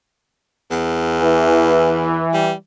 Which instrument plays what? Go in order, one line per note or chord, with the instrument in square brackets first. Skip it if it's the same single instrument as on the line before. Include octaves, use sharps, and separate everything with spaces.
[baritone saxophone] E2
[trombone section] E3
[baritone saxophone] G3